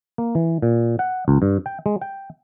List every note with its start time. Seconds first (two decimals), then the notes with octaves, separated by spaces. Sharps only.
0.18 A#3
0.35 E3
0.62 A#2
0.99 F#5
1.28 C#2
1.42 G2
1.66 G5
1.86 G#3
2.02 G5